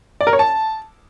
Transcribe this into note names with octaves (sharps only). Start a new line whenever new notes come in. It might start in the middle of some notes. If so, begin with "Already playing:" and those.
D5
A#4
C#5
A5